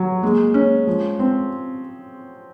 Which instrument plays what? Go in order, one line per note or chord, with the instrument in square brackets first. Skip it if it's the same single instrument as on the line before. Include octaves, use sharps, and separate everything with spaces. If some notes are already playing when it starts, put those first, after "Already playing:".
Already playing: [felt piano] F#3
[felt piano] G#3 [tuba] A#3
[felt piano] C#4
[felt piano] F3 [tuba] G#3
[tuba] G#3 [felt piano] C4